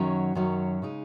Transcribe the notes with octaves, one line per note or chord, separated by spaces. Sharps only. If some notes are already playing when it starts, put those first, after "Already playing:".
Already playing: F#2 D#3 F#3 C#4
F#2 D#3 F#3 C#4
C#3 G#3 D#4